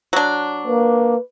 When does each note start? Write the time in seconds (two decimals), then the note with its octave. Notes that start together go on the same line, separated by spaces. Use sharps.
0.13 F#3 D4
0.67 A#3 B4